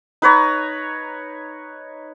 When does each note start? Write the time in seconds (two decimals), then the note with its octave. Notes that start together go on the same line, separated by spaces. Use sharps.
0.22 D#4 B4 C#5 A#5